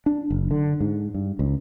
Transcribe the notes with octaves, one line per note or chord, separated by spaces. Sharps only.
D4
F#1
D3
G#2
G2
C#2